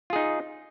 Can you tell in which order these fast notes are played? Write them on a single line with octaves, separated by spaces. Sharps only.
F4 G#4 D#4